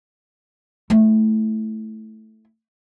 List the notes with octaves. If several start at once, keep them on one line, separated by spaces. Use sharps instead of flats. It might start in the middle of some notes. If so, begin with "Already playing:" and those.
A3 E4